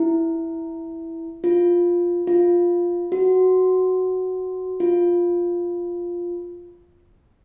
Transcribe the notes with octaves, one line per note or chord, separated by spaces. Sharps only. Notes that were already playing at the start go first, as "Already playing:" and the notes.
Already playing: E4
F4
F4
F#4
F4